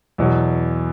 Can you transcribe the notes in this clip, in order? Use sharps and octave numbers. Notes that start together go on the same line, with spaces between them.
E2 B2 F#3